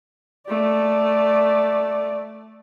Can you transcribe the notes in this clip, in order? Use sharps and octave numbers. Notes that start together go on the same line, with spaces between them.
A3 D5